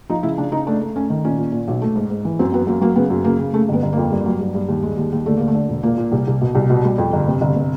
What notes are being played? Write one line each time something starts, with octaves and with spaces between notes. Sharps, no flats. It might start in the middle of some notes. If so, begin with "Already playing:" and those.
F3 D#4
C#3 E4
C#3 D4
C#3 D#4
A3 D4
A3
A3 C#4
D#3
A#2 C#4
A#2
A#2
B1
A3
G#2
G#2
E3
F#2 C4
F#2 B3
F#2 A#3
F#3 A#3
C#3 B3
F#2
C#3 A#3
C#3
C#3 A3
G1 B3
G1
F2 A#3
G2
F#3
G2
G2
D#2
G#3
D#2
D#2
D3 A3
D3 A#3
A3
D3
E1
A#2 A#3
A#2
C2
C2
B2
C2
B2
G3
F2
G1
C3
G1
C3